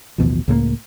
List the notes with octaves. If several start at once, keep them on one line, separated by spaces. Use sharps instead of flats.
A1 D#2 B2 F3
C#2 A2 G3 A#3